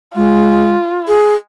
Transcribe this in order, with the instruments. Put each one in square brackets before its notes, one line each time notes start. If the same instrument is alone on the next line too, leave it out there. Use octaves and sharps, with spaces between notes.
[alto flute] G#3 [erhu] F4
[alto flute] G#4